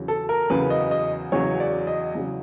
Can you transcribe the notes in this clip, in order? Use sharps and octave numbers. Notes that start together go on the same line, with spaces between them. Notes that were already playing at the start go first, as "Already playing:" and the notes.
Already playing: E2 C#3 F#3
A4
A#4
E2 C#3 F#3 B4
D#5
D#5
E2 C#3 F#3 C#5
D5
D#5
E2 C#3 F#3